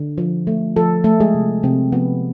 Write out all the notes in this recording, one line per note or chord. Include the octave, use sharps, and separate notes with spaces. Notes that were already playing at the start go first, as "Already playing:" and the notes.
Already playing: D3
F3
A3
F3 A4
A3 A4
G#3 G#4
C3
C3 C4
F3 B3